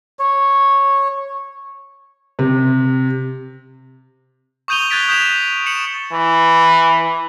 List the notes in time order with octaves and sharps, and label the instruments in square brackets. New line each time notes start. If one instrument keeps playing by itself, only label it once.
[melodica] C#5
[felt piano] C3
[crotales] C#6 D#6 G6 D#7 F7 G7
F#6 G#6 A6 B6 D7
D#6 G6 B6 E7 F7
C#7 E7 F#7
[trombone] E3